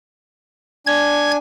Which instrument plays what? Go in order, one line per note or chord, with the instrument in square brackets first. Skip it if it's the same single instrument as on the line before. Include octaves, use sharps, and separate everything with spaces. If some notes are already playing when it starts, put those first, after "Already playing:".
[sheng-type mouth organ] D4 G#5 [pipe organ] G#6